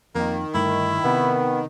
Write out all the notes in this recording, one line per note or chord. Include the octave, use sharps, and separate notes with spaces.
F2 D#3 A#3
G1 G2 A3 E4
C3 B3